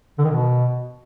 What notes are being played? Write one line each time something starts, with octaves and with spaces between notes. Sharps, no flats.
D3
D#3
B2